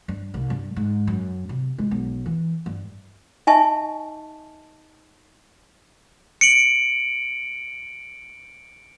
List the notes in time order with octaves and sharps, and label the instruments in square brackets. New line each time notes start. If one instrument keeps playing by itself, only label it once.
[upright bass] G2
C2
G2
G#2
F#2
C3
G#3
B1
E3
G2
[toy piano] D#4 D#5 E5 G#5 A5 C#6
[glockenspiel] C#7 D7 F#7